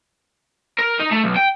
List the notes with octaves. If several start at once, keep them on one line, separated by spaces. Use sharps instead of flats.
A#4
D#4
A3
B1
G5